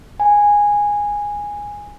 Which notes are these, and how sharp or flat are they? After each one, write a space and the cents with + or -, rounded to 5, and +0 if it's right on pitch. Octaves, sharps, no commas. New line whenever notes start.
G#5 -10